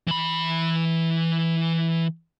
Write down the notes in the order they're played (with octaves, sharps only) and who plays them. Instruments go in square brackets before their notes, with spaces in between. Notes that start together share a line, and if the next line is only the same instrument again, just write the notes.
[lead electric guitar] E3 B5